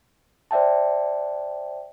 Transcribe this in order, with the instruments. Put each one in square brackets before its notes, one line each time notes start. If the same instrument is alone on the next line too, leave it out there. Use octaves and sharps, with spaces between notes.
[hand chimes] C5 D5 E5 G5 A5